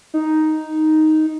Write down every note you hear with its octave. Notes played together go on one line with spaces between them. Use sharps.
D#4